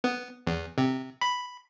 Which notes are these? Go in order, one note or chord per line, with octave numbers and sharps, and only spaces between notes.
B3
E2
C3
B5